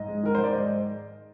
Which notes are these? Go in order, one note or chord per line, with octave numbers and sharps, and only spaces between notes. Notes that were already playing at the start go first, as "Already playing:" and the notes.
Already playing: G#2 D#5
G#3
D#3 A#4
G#2 C5
D5
G#3 D#5